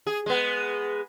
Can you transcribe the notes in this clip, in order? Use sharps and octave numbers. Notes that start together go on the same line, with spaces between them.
G#4
G#3 B3